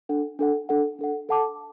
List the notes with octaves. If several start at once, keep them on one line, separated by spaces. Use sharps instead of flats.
D4 A4 F#5
D4 A4 F#5
D4 A4 F#5
D4 A4 F#5
A4 F#5 A5 D6